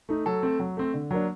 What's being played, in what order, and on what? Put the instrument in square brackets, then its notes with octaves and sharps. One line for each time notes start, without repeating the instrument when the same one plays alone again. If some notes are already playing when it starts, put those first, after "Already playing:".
[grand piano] A3 D#4
F#3 A4
A3 C4
F#3
A3 C4
D3
F#3 A#3 D4